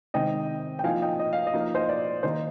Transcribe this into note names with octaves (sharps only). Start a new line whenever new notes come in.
C3 D#3 G#3 C4 D#4 D#5 G5
G5
F3 A#3 D#4 F5 G#5
D#5 G5
D#5
F5
D#5
F3 A#3 D#4
F5
C5 D#5
D5
D#3 A#3 D#4 C5